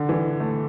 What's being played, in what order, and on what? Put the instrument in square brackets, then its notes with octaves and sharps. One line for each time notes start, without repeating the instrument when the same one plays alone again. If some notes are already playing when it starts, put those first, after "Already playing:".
Already playing: [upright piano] D3
E3
A3